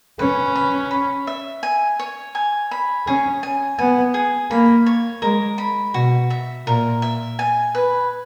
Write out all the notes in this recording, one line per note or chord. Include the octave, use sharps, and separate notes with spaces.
C#4 B4
B5
B5
E5
G#5
C#5
G#5
B5
C#4 G#4
G#5
B3 G#5
G#4
A#3 B5
C#5
G#3 A#4
B5
B2 F#4
E5
A#2 A#4
E5
G#5
B4